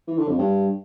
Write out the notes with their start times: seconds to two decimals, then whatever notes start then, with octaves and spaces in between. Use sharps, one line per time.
0.08 E3
0.18 D3
0.28 F2
0.38 G2